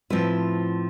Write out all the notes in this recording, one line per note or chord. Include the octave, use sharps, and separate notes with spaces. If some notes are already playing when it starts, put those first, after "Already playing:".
A2 F3 C4 E4 B4